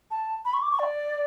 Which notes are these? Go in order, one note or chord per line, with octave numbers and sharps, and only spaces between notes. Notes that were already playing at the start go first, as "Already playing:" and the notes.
A5
B5
C#6
D6
C#6
D5